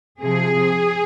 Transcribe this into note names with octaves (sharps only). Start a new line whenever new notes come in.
C3 F3 C4 G#4